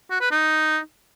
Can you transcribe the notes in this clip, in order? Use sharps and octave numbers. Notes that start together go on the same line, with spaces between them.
F#4
B4
D#4